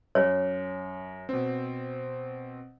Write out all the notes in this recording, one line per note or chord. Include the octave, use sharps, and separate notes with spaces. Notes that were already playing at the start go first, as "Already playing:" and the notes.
F#2 C#5
B2 C4